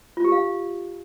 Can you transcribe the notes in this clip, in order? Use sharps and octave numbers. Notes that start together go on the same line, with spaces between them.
F4
G4
F5